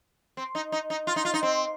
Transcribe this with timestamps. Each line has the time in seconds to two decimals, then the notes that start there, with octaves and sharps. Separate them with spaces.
0.37 C4
0.55 D#4
0.72 D#4
0.90 D#4
1.07 F4
1.16 D#4
1.25 F4
1.34 D#4
1.43 C4